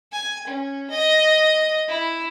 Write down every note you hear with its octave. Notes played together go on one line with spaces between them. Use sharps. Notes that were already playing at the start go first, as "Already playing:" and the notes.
G#5
C#4
D#5
E4